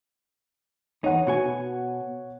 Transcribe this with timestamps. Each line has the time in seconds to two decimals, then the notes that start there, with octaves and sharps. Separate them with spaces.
1.04 E2 D#4 C#5 F#5
1.27 B2 F#4 G#5